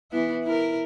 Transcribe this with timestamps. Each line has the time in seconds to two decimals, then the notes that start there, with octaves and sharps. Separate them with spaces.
0.11 E3 B3 E4
0.44 E4 A#4